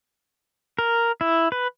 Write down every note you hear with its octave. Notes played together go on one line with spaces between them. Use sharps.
A#4
E4
B4